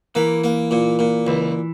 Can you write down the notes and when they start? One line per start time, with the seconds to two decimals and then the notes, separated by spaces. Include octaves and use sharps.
0.15 E3 A#3
0.44 A#3
0.71 A#2
0.99 A#2
1.27 C#2 E3